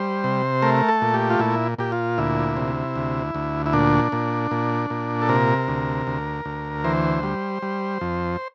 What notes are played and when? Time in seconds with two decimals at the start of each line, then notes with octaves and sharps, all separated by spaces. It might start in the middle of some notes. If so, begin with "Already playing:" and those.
Already playing: G3 C5
0.24 C3
0.62 A3 A#4
0.89 A4
1.02 A#2
1.14 G4
1.30 F4
1.40 A#2 E4
1.78 A#2 G4
1.92 F4
2.18 D2 E4
2.57 C3
2.96 D2
3.35 D2
3.66 E4
3.73 A#2 D4
4.12 A#2
4.51 A#2
4.90 A#2
5.22 A4
5.29 C3 A#4
5.68 D2
6.07 D2
6.45 D2
6.84 E3 C5
7.23 G3
7.62 G3
8.01 F2